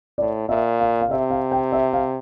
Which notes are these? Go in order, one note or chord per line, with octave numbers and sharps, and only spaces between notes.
A2 D5
A#2 E5
F5
F5
C3 E5
F5
G5
E5
F5